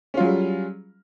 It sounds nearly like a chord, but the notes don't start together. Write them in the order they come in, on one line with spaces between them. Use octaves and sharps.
C#4 F4 F#3 G#4 G3